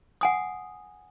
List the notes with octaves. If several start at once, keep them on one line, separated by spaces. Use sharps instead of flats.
F#5 G#5 D#6